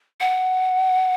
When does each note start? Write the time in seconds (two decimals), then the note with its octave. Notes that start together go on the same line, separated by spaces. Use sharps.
0.20 F#5